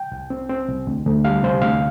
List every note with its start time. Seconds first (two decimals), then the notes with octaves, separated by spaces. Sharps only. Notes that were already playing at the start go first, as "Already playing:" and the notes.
Already playing: G5
0.12 C2
0.30 C4
0.50 C4
0.68 C2
0.87 D2
1.06 D2
1.24 G3 F5
1.43 C3 C5
1.62 D2 F5